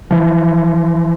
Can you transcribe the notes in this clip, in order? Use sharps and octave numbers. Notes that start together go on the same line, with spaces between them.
E3 F3